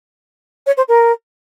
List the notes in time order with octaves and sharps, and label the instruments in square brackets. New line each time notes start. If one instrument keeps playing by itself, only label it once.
[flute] C#5
C5
A#4